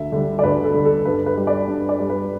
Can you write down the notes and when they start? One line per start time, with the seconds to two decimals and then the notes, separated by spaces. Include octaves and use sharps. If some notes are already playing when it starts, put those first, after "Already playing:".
Already playing: D2 E5
0.12 D3 G3
0.39 D5
0.43 D2 B4
0.64 A4
0.74 D3 G3
0.85 A4
1.05 G2 B4
1.26 B4
1.37 G3
1.47 D5
1.68 G2
1.89 D5
2.00 G3
2.10 B4